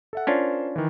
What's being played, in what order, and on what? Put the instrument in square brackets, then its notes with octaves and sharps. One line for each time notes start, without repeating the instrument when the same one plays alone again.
[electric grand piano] A4 E5 F#5
[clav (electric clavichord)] C#4 D4 F4 [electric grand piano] A#4 C5
[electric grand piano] D#3 E3